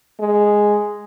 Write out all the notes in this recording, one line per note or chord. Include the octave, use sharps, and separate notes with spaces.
G#3